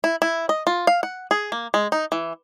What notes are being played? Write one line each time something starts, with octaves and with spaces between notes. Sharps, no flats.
E4
E4
D#5
F4
F5
F#5
G#4
A#3
G#3
D#4
E3